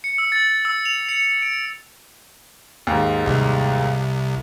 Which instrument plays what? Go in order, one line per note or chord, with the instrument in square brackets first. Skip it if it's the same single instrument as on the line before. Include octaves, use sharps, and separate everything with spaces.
[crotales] C#7
E6
A6
A6
E6
F7
C#7
D7
[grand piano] D#2 G#2
[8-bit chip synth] C2